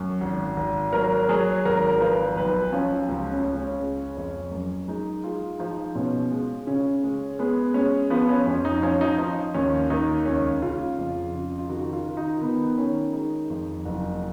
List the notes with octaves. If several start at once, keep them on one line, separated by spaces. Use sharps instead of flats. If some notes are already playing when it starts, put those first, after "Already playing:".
Already playing: F#2
G#1
G#1
F#3 A#4
F#3 G#4
G#1 A#4
F3 B4
B1 B4
F3 C#4
C#2
C#4
C#2
C#4
G#3
F2
F#2
G#3 D#4
G#3 F4
F3 D#4
B2 C#4
G#3
C#3 C#4
G#3
G#3 B3
G#3 C#4
F3 B3
C#4
F2 C#4
D#4
F3 C#4
D#4
F3 D#4
D#2 C#4
D#2 D#4
C#2 C#4
C#3 F4
F2
C#3
F4
D#3 F#4
F4
D#3
D#4
D#3 B3
D#3 C#4
G#3 D#4
F2
F#1